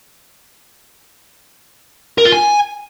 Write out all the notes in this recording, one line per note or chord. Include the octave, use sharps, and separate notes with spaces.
A#4
F4
G#5